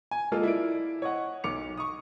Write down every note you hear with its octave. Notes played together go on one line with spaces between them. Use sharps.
G#5
G#3 A#3 F4 A4
E4 D5 D7
C#5 D#5 F#5
B1 D6 C#7 F7
C#6 D#6